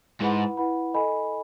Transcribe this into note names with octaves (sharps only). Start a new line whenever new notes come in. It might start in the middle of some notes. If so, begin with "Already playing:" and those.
G#2 E4 B4 F#5 B5
E4 B4 F#5 B5
A4 D#5 G#5 B5